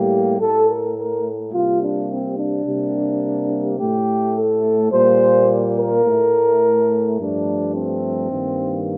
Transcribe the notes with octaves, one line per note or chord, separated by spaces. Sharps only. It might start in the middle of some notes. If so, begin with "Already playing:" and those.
Already playing: A2 G3 A#3 G4
A2 A3 A4
A#4
A#4
C3 G3 A#3 F4
D4
C4
D4
C3 G3 A#3
A2 A3 G4
A4
A#2 G3 A#3 C5
A#4
A2 A3
G2 F3 A3 D4
C4
G2 D#3 A#3